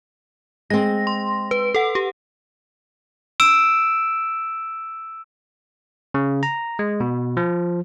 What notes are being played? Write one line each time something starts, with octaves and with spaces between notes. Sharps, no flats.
G#3 C4 A#6
C6
B4
A4 F#5
G4
E6 D7 E7
C#3
A#5
G#3
B2
F3